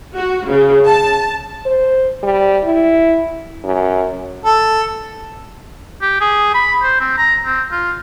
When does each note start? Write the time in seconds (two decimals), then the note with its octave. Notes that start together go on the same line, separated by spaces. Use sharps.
0.16 F#4
0.48 C#3
0.86 A5
1.66 C5
2.23 G3
2.64 E4
3.64 F#2
4.45 A4
6.02 G4
6.21 G#4
6.55 B5
6.82 C5
7.00 C4
7.18 A#5
7.45 C4
7.72 F4